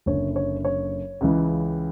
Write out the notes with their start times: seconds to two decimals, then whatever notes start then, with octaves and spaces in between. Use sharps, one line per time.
0.06 F#1 F#2 D3 C#5
0.36 C#5
0.65 C#5
1.21 C#2 C#3 E3